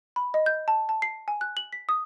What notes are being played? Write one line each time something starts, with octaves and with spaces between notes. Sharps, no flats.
B5
D#5
G6
A5
A5
C7
G#5
F#6
F#7
B6
D#6